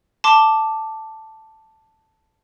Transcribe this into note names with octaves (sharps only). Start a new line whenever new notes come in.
A5 C6 D6